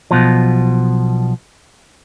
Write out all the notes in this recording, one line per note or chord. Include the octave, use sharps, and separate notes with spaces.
B1 B2 F3